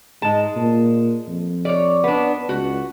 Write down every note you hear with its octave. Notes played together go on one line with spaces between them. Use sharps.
G#2 G#3 A5
A#2
F2
C#5 D5
B3 D4
C#2 F#4